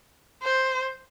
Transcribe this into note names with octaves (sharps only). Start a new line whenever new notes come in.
C5